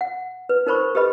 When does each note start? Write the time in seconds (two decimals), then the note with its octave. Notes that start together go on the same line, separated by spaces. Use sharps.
0.01 F#5
0.49 B4
0.67 D#4 A#4 C5 B5 C#6
0.95 G4 A4 B4 D#5 B5